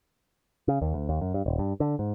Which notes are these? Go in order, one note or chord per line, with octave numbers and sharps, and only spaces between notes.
C#3
D#2
D2
D#2
F#2
G2
D#1
G2
D3
G#2